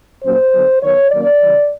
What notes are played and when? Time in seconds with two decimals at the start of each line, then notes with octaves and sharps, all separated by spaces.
0.24 A#2 F#3 A#3 C#4 C5
0.54 D3 F#3 B3
0.82 D#3 F#3 B3 C#5
1.12 D#3 F#3 A#3 C#4 D5
1.41 C#3 E3 G3